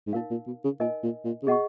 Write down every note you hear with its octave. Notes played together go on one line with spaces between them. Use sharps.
G#2
A#2 D#4 A#4 F5
A#2
B2
C#3
A#2 D#4 A#4 D#5 G#5
A#2
A#2
C#3
B2 G#4 D#5 F#5 C#6